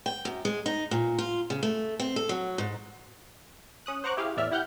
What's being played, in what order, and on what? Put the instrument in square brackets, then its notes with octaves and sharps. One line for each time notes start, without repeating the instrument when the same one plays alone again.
[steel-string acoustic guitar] G5
F#2
G#3
D#4
A#2
F4
C#3
A3
C4
A4
F#3
G#2
[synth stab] C#4 D#6 F#6
C5 F#5 A#5 C#6 D6 F#6
E4 G4 G#4 F5
E2 A2 D5 E5 F6
E4 G4 F#5 F6 G6